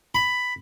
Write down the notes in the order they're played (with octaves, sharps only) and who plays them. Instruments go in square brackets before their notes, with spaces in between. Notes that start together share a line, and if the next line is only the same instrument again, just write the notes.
[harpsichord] B5